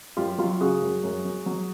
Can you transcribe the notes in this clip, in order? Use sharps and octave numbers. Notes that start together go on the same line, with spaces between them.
F#2 F4 G4
F#3 F4 G4
C#3 F#4 G#4
F#2
F#2
F#3
F#3